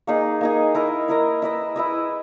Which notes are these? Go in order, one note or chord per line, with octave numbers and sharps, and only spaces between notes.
A#3 D#4 G#4
A#3 D#4 G#4
E4 A#4 D#5
E4 A#4 D#5
E4 B4 D#5
E4 B4 D#5